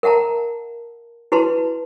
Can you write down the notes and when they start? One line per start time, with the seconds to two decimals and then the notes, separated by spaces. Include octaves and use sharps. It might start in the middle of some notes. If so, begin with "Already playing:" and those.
0.03 A#4 E5 F#5 A5 A#5
1.32 E4 F#4 B4 A5 C6